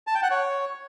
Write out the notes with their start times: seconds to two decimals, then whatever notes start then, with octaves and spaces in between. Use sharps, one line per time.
0.07 A5
0.15 G5
0.23 F#5
0.31 C#5